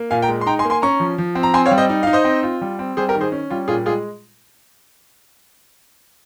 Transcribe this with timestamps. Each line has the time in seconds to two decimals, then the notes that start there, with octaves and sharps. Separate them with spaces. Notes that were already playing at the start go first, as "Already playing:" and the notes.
Already playing: A#3
0.11 A#2 F5 G#5
0.22 G5 A#5
0.28 G#3
0.41 C6
0.46 D#4 G5 A#5
0.59 G#5 C6
0.65 A#3
0.70 G#5 C6
0.82 C#4 A#5 C#6
1.00 F3
1.18 F3
1.35 C4
1.43 A#5
1.54 C4 G#5 C6
1.66 C#5 F5
1.71 G3
1.78 C5 D#5
1.89 D#4
2.03 D#4 F5
2.13 C5 D#5
2.25 C4
2.43 F4
2.61 G3
2.79 C4
2.97 G3 G#4 C5
3.09 G4 A#4
3.15 D#3
3.21 G#4 C5
3.32 C#4
3.50 G3 F4
3.68 A#2 F4 G#4
3.86 G#3 F4 G#4